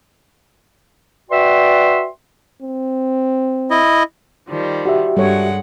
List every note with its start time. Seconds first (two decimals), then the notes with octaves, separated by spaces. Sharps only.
1.30 F#4 B4 D5 E5 G5 C6
2.62 C4
3.70 E4 D#5
4.49 D#3 F3 G3
4.85 F#4 G4 E5
5.17 G2 G3 G#3 A4 C#5 F#5